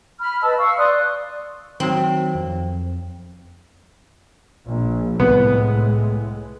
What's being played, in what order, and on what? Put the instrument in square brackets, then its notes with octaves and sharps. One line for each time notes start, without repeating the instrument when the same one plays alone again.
[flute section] B5 F6
B4 D#5 A5 E6
F5 C#6 E6
D5 C6 D#6 F#6
[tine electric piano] D#3 F#3 [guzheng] C4
[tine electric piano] F2
[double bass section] A#1
[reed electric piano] C2 [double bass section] A2 G#3 [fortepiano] B3